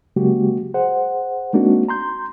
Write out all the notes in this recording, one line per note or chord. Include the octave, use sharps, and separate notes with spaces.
C#3 F#3 G#3 A#3 F#4 G4
G#4 C5 F#5
G#3 A#3 C4 D4 D#4 F#4
A#5 C6 G6